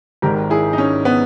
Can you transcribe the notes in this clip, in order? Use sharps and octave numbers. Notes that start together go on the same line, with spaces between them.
G#1 G#2 D#3 G4 A#4
E4 G#4
D#4
C#4
B3